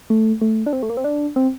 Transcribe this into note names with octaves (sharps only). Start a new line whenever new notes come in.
A3
A3
D4
C4
A3
A#3
C4
D4
C4